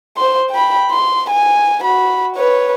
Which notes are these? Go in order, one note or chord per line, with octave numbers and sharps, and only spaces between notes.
C5 C6
G5 B5
C6
G#5
F#4 B5
B4 C#5